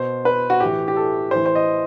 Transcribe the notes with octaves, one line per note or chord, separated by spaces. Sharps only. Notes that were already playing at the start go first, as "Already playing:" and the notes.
Already playing: B2 C5
B4
F#4
A2 E3 G4
G4
A4
A2 E3 C5
C5
D#5